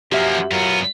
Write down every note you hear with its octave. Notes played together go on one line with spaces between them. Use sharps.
F#2 F3 A#3 G4 E5
F#2 F#3 B3 F4 A#4